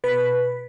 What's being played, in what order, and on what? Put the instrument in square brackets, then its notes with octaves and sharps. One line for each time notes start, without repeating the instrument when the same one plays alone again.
[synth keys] B2 B4